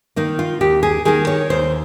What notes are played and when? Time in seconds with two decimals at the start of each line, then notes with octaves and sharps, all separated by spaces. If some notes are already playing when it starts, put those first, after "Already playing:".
0.16 D#3 A#3 D#4
0.39 F4
0.61 D#2 G4
0.83 G#4
1.05 D#3 A#3 G#4
1.27 C#5
1.50 D#2 C5